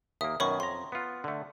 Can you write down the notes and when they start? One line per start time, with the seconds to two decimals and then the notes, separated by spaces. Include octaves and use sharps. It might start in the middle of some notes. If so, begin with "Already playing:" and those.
0.21 D#2 A#3 E5 D#6
0.40 F#2 B2 D#3 C#5 B5 C#6
0.60 F2 A#5 C6
0.92 B3 F4
1.24 D3 A3